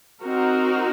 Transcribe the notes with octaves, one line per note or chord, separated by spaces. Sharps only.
C4 D#4 F#4 A#4